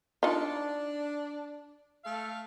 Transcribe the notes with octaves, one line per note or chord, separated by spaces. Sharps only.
D4 D#4 F4
A3 A4 F5